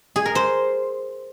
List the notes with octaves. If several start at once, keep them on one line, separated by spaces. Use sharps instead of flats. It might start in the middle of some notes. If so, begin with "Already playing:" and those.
G#4
A#4
C5